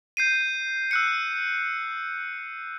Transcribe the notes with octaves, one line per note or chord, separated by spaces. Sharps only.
G6 C7 D#7
E6 F#6 C#7